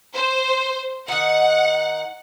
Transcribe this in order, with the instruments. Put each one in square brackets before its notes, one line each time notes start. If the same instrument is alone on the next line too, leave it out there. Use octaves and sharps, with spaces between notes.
[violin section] C5
[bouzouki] D#3 D#4 [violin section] F#5